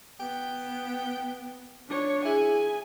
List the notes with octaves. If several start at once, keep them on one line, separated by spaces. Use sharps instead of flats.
B3 G5
D4 C#5
E4 G#4 G#5